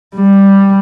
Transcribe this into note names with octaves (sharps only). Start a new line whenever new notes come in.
G3